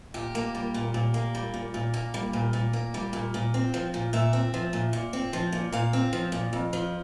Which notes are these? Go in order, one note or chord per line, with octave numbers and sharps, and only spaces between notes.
A#2 G4
A#3
G3
A#2
A#2
A#3
G3
A#2
A#2
A#3
G3
A#2
A#2
A#3
G3
A#2
A#2
C4
F3
A#2
A#2 E5
C4
F3
A#2
A#2
C4
F3
A#2
A#2 F5
C4
F3
A#2
F2
F3